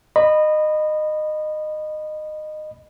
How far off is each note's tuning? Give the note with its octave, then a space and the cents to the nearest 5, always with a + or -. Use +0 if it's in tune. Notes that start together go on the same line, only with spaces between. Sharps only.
D#5 -20 B5 +0